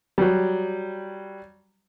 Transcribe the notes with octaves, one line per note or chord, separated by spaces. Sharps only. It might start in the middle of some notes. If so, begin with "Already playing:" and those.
F#3 G3